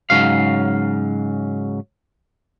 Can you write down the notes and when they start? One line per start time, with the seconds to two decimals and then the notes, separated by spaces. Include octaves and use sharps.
0.10 G#2 C#3 F#3 F5